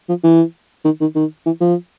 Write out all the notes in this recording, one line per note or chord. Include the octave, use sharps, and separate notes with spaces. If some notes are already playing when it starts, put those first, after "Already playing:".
F3
E3
D#3
D#3
D#3
E3
F3